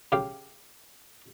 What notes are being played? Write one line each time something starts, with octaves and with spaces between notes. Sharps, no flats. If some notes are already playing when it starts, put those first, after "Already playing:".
C#3 G4 F5